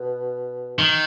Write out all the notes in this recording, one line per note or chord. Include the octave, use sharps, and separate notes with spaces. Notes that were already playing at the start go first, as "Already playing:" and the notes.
Already playing: B2
D#3